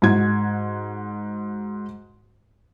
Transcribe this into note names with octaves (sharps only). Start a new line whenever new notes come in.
G#2 F#4 G#6